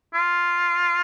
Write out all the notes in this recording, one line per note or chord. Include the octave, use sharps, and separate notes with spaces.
F4